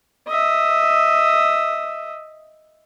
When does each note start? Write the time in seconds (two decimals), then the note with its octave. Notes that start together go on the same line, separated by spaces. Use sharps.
0.28 D#5 E5